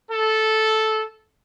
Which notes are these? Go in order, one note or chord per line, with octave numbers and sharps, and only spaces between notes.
A4